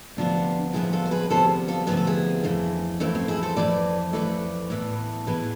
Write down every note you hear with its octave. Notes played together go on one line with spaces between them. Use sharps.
D2 C3 F3 B3 D4 F4
D2 C3 F3 B3 E4 G#4
F4 A4
C5
G#4 B4
D2 C3 F3 B3 A4 C5
F4 A4
D2 C3 F3 B3 G#4
A4
E4 G#4
F2 E3 A3
F2 E3 A3 C4 E4
C4
E4 G#4
A4 C5
F2 E3 A3 B4 D5
F2 E3 A3 B4 D5
A2 E3 B3
A2 E3 B3 G#4 B4